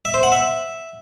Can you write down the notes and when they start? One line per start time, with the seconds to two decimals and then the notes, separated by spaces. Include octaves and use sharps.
0.05 E5
0.14 C5
0.23 F#5
0.32 E5